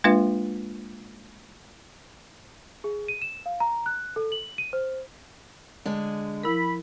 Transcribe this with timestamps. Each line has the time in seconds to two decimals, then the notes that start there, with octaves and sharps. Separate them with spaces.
0.04 G#3 A#3 D4 F4 B4 E5
2.84 G#4
3.08 D#7
3.22 E7
3.46 F5
3.60 A#5
3.86 F#6
4.16 A4
4.32 F#7
4.58 D#7
4.73 C5
5.85 D3 G#3
6.43 F3 E4 A#4 B5